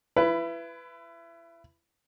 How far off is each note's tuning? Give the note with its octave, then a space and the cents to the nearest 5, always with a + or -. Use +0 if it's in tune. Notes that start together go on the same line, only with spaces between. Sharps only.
E4 +30 B4 +10